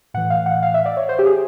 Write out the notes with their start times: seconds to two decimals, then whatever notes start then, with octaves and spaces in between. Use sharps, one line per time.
0.14 A2 F#5
0.17 E3
0.30 F5
0.46 F#5
0.62 F5
0.74 E5
0.86 D5
0.97 C#5
1.09 C5
1.19 G4
1.26 G#4